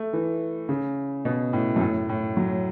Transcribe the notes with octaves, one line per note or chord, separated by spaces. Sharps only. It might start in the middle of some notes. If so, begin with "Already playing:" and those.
Already playing: A3
E3
C#3
B2
A2
F#2
A2
A2
F#3